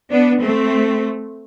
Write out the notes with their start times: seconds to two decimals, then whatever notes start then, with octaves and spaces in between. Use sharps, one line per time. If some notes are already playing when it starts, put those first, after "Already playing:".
0.11 B3 D4
0.40 A3 C4